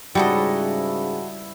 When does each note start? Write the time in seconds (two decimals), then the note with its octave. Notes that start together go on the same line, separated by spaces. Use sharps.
0.15 G#2 C#3 G3 E4 F#4 A4 B4 D#5